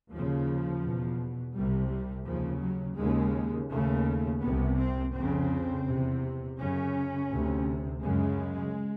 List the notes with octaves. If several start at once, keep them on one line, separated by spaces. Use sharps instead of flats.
D#2 C#3 F3
E2 B2
C2 C3 G3
G3
D#2 C#3 F3
F#3
D#2 C#3 G#3
D#2 C#3 A3
C2 C3 B3
C4
F2 C#3 C4
E2 C3
F#2 C#3 C#4
D2 C3
F#2 C#3 G#3